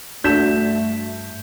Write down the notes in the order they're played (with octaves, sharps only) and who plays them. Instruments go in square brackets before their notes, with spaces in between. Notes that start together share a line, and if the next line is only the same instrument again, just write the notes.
[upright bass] G2 [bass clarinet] A3 [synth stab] D4 F#4 A4 [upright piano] G6 B6 E7